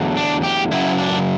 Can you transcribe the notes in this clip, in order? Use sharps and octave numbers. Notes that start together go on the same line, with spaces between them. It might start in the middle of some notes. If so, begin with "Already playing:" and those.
Already playing: E2 D3 F#3 A3
D4
G4
F#2 C#3 F#3 E4
D4